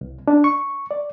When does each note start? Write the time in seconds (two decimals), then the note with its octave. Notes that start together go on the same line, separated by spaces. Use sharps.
0.01 C2
0.28 D4
0.44 C#6
0.91 D5